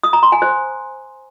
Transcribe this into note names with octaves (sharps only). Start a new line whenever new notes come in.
D#6
A#5
C6
G#5
C5